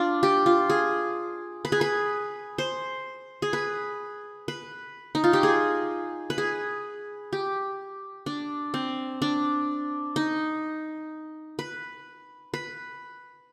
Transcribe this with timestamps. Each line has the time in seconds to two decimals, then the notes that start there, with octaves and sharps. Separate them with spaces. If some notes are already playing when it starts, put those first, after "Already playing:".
Already playing: D4 F4
0.23 G4
0.46 F4
0.70 G#4
1.65 B4
1.72 G#4
1.81 B4
2.58 C5
3.42 G#4
3.53 B4
4.48 B4
5.15 D#4
5.24 F4
5.33 G4
5.43 G#4
6.30 B4
6.38 G#4
7.33 G4
8.26 D4
8.74 C4
9.22 D4
10.16 D#4
11.59 B4
12.54 B4